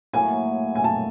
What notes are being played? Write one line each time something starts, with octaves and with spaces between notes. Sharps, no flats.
A2 F#3 A#3 G#5
G#5
A5